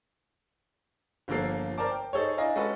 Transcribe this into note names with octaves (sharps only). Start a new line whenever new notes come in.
G1 D3 F3 A#3 A4 C7
A#4 C5 D5 A5 D6
G5
D#4 G#4 A4 C5 C#5
D4 E4 D#5 F5 G#5 A#5
G#3 C#4 F#4 A4 B4